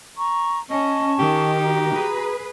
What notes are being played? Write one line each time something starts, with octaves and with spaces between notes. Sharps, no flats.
A#5 C#6
C#4 D#5 G#5 A5 C#6
D#3 G4
F#4 A#5
G#4 B4